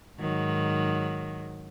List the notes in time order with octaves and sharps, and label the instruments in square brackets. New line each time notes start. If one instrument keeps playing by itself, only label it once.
[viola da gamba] G#2 D#3 F#3